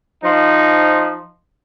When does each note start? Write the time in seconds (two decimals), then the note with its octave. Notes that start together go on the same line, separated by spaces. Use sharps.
0.24 F3 D#4